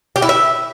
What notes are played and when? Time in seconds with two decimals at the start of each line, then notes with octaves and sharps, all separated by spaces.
0.16 G4
0.22 E4
0.29 E5